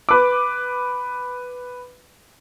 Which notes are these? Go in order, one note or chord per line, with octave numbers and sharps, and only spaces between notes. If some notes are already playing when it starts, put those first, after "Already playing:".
B4 D6